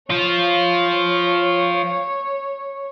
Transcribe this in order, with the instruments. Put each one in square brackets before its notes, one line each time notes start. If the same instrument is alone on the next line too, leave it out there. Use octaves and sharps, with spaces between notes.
[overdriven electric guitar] F3 F4 [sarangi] C#5